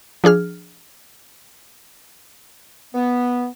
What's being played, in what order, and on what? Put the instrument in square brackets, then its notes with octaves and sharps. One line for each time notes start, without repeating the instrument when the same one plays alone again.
[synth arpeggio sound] F3 D4 G#4 F6
[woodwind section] B3